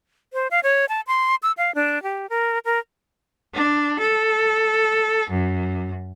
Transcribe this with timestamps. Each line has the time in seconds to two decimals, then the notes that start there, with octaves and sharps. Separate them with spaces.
0.33 C5
0.51 F5
0.63 C#5
0.89 A5
1.07 C6
1.43 E6
1.57 F5
1.75 D4
2.03 G4
2.30 A#4
2.65 A#4
3.54 D4
4.00 A4
5.30 F#2